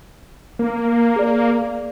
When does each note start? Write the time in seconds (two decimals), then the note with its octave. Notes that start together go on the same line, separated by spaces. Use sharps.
0.59 A#3
1.16 G#4 D5